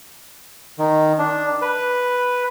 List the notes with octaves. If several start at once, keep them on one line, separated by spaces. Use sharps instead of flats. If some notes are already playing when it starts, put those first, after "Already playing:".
D#3
D4
B4